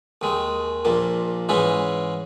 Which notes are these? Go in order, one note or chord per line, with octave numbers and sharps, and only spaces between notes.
D#2 D#3 G#3
A#1 A#2 A#3
G#2 E3 G#3 C#4 E4